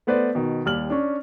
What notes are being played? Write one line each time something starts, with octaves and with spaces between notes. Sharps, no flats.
A3 B3 B4 C5 D5
B2 D#3
D#2 G3 F6 F#7
C#4 D4